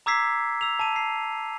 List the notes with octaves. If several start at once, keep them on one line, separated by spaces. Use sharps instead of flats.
A#5 D6 E6 G#6 B6 C7
E6 F7
A5 D#7
C7